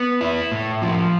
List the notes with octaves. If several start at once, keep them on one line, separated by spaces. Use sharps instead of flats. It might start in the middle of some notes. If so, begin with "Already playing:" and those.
Already playing: B3
E4
A2
F3